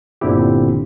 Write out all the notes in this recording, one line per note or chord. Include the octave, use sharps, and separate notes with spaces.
G1 A#2 D3 C4 E4 G4